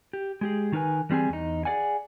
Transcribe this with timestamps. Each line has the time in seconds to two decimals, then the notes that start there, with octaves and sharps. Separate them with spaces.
0.13 G4
0.41 G#3 G4 G#4
0.72 D#3 D#4 A#4 B4 G#5
1.09 E3 G3 C4 G#4 G#5
1.29 E2 D#4
1.65 G#4 A#4 D5 F#5 G#5